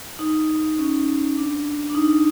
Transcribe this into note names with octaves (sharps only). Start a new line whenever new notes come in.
D#4
C#4
D4
D4
D#4